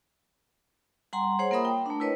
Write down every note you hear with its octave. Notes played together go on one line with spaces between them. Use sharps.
G3 F#5 G#5 A#5 C6
G#4 C5 C#5 F#5
A#3 F4 A#4 E5 B5 D#6
G5
A3 D4
E4 A#4 B4 C#5 D#5